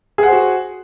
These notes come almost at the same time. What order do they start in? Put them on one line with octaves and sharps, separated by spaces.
G#4 F#5 C5 F#4